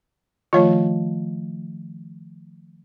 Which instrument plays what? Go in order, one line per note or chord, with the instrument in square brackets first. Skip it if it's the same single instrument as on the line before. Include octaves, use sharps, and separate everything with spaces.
[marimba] D#3 F3 A3 [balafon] F4 C#5